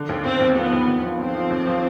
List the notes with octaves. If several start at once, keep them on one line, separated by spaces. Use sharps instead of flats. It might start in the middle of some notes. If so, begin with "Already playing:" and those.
Already playing: D3
D#2
D#2 C4
D#2
F3 B3
D#2
D#2
F3
F3 C4
F3
D#2
F3